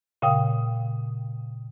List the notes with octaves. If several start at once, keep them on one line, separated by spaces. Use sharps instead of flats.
A#2 C#3 F5 G5 D#6